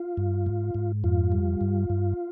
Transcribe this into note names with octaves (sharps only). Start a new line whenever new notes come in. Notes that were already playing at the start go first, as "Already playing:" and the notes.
Already playing: F4
G2
G#2
G#2
F2 F4
G3
G2
G2